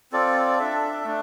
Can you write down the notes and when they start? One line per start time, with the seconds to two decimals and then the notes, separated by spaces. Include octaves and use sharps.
0.12 C4 F4 A4 D5
0.59 D4 A4 E5
1.04 A3 D4